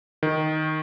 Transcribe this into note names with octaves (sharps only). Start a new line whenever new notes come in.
D#3